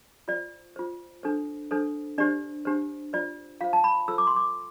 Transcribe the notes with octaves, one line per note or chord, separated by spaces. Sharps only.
F4 C5 D5
F4 C5
D4 A4 C5
D4 A4 C5
D4 G4 C5 D5
D4 G4 C5
F4 C5 D5
F4 C5 F5
A5
B5
F4 A4 C5 E6
D6
C6
D6